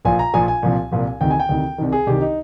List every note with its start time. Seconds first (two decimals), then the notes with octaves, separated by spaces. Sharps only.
0.05 A#1 A#2 F3 G#5
0.19 A#5
0.34 A#1 A#2 F3 G#5
0.48 G#5
0.63 C2 A#2 F3
0.91 C2 A#2 F3
1.21 D2 C3 D#3 G5
1.31 G#5
1.40 G5
1.49 D2 C3 D#3
1.78 C2 C3 D#3
1.92 G#4
2.06 C2 C3 D#3 G4
2.21 D#4